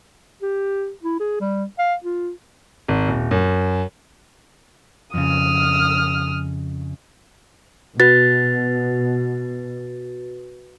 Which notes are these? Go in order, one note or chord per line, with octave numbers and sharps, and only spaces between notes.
G4
E4
G#4
G3
F5
F4
G#1
D#1
F#2
F2 C#3 D#6 F6
B2 F#4 B4 A6